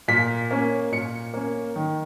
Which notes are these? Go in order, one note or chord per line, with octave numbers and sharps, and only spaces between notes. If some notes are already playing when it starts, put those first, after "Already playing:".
A#2 B6
A#3 C#4
A#2 C#7
A#3 C#4
D#3